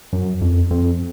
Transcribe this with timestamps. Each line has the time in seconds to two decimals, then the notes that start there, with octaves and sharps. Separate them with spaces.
0.13 F#2
0.41 F2
0.71 F2